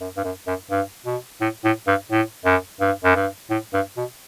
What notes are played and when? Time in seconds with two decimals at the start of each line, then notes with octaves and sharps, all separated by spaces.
0.01 F#2
0.17 G2
0.24 F#2
0.47 F#2
0.70 G2
1.06 B2
1.41 A2
1.64 A2
1.87 G2
2.11 A2
2.45 F#2
2.80 G2
3.04 F#2
3.16 G2
3.50 A2
3.73 G2
3.97 B2